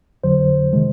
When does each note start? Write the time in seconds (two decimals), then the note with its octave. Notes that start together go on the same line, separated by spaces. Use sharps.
0.24 F2 D3 F#3 C5
0.73 C3 D#3 G#3